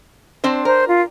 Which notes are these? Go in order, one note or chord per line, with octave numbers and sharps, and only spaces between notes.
C4 D4 C5
A#4 C5
F4